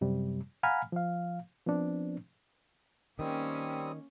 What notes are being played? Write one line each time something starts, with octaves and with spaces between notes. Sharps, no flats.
F#2 C3 G3
F5 F#5 G#5 A#5 B5 F6
F3 F5
F3 B3 C4 D4
D#3 G3 A#3 C4 C#4 D#6